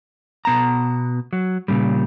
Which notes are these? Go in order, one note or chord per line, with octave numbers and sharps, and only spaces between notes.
B2 B3 A5 A#5
F#3
A#2 C#3 G3